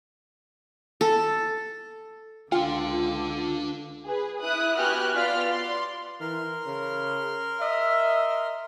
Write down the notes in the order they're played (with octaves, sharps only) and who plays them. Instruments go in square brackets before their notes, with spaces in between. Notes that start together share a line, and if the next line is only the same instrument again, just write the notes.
[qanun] A4
[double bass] C#2 D3 [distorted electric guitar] D4 F#5 [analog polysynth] F4 [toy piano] G5
[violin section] G#4 B4
E4 D#6 F#6
B3 F#4 G4 G#5 F6 F#6
B3 F4 D5 C6 F6 B6
D5 C6
[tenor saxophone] E3 [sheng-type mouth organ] A#4 C6 F6
[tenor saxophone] C#3
[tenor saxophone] D#5 [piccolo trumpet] E5